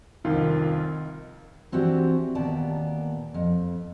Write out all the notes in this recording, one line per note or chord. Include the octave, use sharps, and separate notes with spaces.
C2 F2 D#3 F4
E3 C4 D4 F#4 G4
D#2 A#2 B3 D5 A5
F2